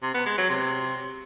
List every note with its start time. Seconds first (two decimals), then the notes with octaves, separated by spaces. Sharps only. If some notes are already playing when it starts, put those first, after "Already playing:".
0.02 C3
0.14 B3
0.26 G#3
0.38 F#3
0.49 C3